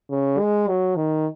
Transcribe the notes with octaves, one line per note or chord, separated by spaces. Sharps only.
C#3
G#3
F#3
D#3